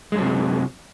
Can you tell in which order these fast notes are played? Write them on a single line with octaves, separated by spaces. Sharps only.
G#3 F#2 F#3 C3